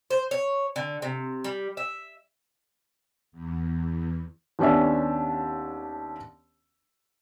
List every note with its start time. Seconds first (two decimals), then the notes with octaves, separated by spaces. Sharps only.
0.11 C5
0.31 C#5
0.76 D3
1.02 C3
1.44 G3
1.77 E5
3.32 E2
4.59 D#2 B3 C#4 D4 E5